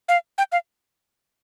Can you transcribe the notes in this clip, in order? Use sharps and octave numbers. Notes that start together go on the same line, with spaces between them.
F5
G5
F5